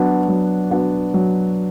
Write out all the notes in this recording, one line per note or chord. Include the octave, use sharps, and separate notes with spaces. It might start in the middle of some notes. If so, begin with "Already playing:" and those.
Already playing: F#3 B3 D4 F#4
F#3
B3 D4 F#4
F#3